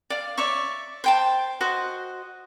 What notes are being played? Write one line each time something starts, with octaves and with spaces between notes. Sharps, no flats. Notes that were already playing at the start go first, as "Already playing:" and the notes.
D5 F5
C#5 D5 E5 C#6
C5 G5 A5
F#4 C5 D#5